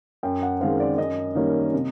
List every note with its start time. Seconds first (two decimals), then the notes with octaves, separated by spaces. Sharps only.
0.23 F#2 G5
0.43 F#5
0.60 D#3 G#3 C4 F5
0.80 D5
0.98 F#2 D#5
1.35 D#3 G3 A#3 C#4
1.74 C3